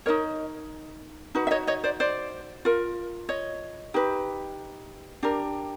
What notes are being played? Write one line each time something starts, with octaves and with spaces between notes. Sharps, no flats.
D#4 F#4 A#4 C#5 D#5
D#4 F#4 B4
E5
C#5 D#5
C#5 D#5
C5 D5
C5 D5
F4 A#4
C#5 D#5
D#4 G4 B4
D4 G4 A#4